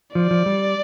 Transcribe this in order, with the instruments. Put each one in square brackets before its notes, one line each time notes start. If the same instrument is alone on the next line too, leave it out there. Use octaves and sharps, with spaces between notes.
[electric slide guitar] F3 [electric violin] D5
[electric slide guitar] F3
G3